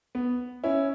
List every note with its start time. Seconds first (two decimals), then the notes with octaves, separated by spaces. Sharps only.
0.15 B3
0.64 C#4 E4